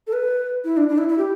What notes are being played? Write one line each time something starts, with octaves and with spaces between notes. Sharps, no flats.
A4
B4
E4
D4
D4
E4
E4
G4